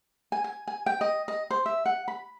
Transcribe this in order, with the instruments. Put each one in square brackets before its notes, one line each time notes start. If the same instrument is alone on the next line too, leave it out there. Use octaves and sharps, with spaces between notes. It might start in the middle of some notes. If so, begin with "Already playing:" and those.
[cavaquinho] G#5
G#5
G#5
G5
D#5
D#5
C5
E5
F#5
B5